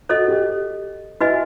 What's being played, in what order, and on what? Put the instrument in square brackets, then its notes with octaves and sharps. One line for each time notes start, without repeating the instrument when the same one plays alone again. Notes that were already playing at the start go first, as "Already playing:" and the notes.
[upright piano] F#4 [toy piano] A4 C5 D#5
[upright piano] G4
[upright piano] E4 [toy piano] F#4 B4 D#5 G#5